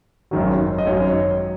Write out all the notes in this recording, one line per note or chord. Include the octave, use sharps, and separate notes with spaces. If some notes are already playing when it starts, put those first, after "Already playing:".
G#1 F#2 D#3 F#3
D#5
G#1 F#2 D#3 F#3 C#5